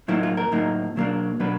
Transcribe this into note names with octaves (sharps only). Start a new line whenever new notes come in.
A2 F#3 A#3 D#4 E4
F4
A#4
A2 F#3 A#3 D#4
B2 F#3 A#3 D4
B2 F#3 A#3 D4 B4